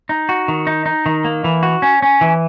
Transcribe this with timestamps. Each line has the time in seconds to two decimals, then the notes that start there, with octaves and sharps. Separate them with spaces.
0.09 D#4
0.29 F#4
0.48 D#3
0.67 D#4
0.86 D#4
1.06 D#3
1.24 A#3
1.44 E3
1.63 F#4
1.82 C#4
2.02 C#4
2.21 E3